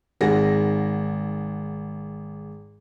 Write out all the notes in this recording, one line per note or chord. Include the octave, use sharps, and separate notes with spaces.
G#1 G#4 F#5 A#6